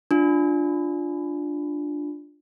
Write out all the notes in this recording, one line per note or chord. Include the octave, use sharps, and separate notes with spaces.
D4 F4